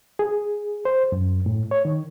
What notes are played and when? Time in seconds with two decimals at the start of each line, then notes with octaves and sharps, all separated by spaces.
0.19 G#4
0.85 C5
1.12 F#2
1.46 A2
1.71 C#5
1.85 D#3